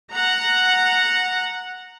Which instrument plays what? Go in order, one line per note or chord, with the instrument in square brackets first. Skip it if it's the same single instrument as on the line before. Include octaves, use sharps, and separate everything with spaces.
[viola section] F#5 A#5